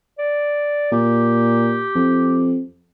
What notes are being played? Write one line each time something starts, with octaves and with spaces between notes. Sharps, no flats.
D5
A#2 G4
F2